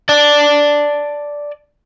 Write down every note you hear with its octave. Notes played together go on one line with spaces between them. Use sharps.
D5 A5